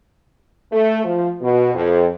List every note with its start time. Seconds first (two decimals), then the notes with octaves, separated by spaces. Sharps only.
0.72 A3
1.04 F3
1.41 B2
1.75 F2